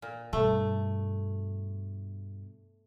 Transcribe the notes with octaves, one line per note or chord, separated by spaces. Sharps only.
A#2
G2 B2 A3